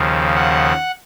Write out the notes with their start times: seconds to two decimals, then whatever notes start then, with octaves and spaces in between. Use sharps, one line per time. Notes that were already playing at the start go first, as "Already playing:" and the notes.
Already playing: D#2 C#3 F3
0.35 F#5